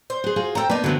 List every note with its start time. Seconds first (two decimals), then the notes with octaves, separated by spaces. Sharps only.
0.10 C5
0.24 B3 G#4
0.36 F4 F#4 G#4
0.55 A4 C5 F#5 G5 A#5
0.69 A#3 B3 D4 D#4 B4
0.84 D3 E3 F#3 B3 C4